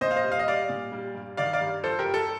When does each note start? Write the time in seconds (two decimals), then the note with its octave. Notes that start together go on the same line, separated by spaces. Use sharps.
0.01 A#2 C5 D#5
0.11 F5
0.16 C5 D#5
0.24 G3
0.32 F5
0.39 D#5
0.47 G3 D5 F5
0.69 A#2
0.92 G3
1.15 G2
1.37 D#3 D5 F5
1.53 D5 F5
1.61 G2
1.83 F3 A4 C5
1.99 G4 A#4
2.06 G2
2.14 A4